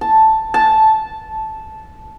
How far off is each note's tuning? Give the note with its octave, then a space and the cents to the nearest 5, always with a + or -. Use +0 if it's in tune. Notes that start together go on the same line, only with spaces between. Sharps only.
A5 +0
A5 -10